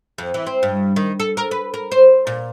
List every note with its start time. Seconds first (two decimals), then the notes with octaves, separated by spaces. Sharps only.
0.18 F2
0.34 E3
0.47 C4
0.63 G2
0.96 D#3
1.20 A4
1.37 A#4
1.51 B4
1.74 A#4
1.92 C5
2.27 A#2